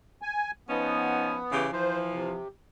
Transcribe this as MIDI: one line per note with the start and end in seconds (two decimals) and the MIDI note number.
0.22 0.51 80
0.69 1.37 53
0.69 1.60 59
0.69 1.37 61
0.69 1.37 63
1.51 1.66 49
1.51 1.66 52
1.51 1.66 67
1.73 2.37 52
1.73 2.37 53
1.73 1.98 72
2.11 2.48 48